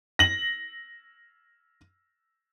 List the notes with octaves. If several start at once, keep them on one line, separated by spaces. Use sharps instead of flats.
A#6 F#7